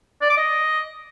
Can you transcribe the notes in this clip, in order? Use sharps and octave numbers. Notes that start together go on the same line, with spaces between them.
D5
D6
D#5